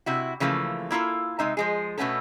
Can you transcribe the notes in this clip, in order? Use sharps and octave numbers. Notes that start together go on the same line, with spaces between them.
C3 E4 F#4
C#3 E3 F3 A3 A#3
A#3 E4 F4 A4
C3 G#3 D#4 E5
F3 G#3 G#4
B2 A3 B3 C#4 A4